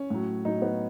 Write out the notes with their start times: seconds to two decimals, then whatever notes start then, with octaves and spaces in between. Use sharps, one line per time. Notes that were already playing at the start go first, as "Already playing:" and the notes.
Already playing: C#4
0.10 A2 F#3
0.45 A2 F#3 D#4
0.62 B3